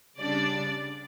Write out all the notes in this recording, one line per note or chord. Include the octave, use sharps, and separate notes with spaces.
C#3 G3 D4 D5